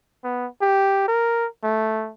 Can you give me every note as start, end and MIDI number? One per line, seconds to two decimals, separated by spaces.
0.24 0.47 59
0.62 1.03 67
1.08 1.47 70
1.64 2.12 57